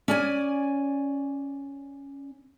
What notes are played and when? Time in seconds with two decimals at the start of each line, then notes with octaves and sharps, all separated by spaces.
0.08 C#4 D5 G#5